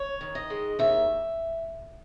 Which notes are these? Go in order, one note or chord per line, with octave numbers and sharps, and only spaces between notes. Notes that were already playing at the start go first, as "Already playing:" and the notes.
Already playing: C#5
D#3
D#5
G#3
D#2 E5